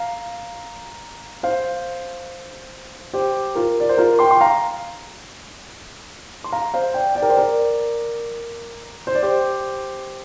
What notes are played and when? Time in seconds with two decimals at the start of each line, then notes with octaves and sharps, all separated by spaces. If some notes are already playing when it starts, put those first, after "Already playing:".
Already playing: F5 A#5
1.43 C5 F5
3.14 G4 C5
3.55 F4 A#4
3.80 D5
3.89 C5
3.98 F4 A#4
4.19 G5 C6
4.31 C6
4.41 F5 A#5
6.44 C6
6.52 F5 A#5
6.74 C5 F5
6.94 D5 G5
7.15 D5 G5
7.22 A#4
7.30 C5
7.37 A#4 D5
9.07 C5
9.15 D5
9.23 G4 C5